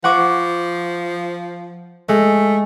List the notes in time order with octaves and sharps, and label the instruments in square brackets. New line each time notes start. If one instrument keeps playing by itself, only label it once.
[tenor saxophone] F3 [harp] F#5 C#6 D6
[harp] G#3 [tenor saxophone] A3